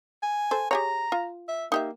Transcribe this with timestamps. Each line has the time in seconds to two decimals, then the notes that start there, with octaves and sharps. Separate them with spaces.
0.23 G#5
0.51 A4 C5
0.71 G4 G#4 C#5 A#5
1.12 F4
1.49 E5
1.72 A#3 D#4 G4 E5